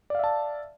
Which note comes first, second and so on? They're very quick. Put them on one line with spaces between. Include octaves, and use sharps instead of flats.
D5 F5 E5 A5